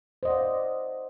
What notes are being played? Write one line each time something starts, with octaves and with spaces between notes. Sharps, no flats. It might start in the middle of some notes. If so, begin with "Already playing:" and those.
C5 D5 D#5 F5 F#5